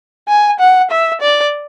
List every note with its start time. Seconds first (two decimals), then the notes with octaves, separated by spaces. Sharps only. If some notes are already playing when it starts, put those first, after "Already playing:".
0.28 G#5
0.60 F#5
0.91 E5
1.21 D5